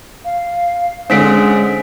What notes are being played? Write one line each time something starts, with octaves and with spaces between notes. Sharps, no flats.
F5
D3 G#3 C4 C#4 B6 D7